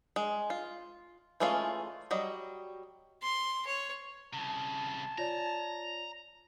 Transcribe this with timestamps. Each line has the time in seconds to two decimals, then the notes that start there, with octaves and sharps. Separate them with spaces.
0.16 G#3
0.50 F4
1.40 E3 G#3 A3 C#4 F4
2.11 F#3 G3 D#5
3.23 C6
3.67 C#5
4.33 C2 C#3 A5
5.18 F4 C#5 D5 A#5